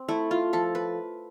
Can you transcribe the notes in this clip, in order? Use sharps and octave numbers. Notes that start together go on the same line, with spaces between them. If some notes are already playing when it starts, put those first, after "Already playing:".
Already playing: C4
A3 E4
F4
F3 A4
B4